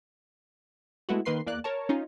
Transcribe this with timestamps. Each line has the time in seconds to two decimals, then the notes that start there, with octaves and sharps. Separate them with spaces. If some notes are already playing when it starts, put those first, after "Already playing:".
1.09 G#3 A3 B3 E4 F#4
1.25 D#3 A#3 B4 C6 C7
1.46 E2 A#3 D5 F#6
1.64 A#4 C#5 A5
1.89 C#4 D#4 F4